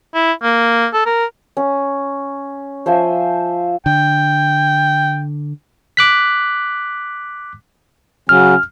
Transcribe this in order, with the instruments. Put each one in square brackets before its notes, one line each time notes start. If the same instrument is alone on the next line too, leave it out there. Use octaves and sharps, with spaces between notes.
[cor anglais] E4
A#3
A4
A#4
[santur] C#4
F3 C5 E5 G#5
[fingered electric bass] D3 [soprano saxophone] G5
[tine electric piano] D6 F#6 B6
[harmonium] C#3 F#3 C#4 [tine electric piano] F6